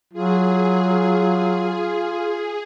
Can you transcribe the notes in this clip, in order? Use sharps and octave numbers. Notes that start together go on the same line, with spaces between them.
F#3 F4 G#4